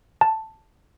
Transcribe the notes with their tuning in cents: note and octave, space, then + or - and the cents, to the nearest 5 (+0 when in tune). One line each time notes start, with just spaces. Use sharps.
A5 +5